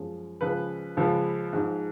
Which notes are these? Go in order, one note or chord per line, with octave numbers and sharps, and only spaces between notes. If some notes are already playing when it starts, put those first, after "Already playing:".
Already playing: F#2 F3 G#3
C#2 C#3 F3 G#3 B4
C#2 C#3 F3 G#3
G#2 F3 G#3